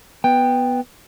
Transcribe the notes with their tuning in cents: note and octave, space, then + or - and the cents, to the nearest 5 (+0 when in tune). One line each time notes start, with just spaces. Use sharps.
B3 +0 G5 +10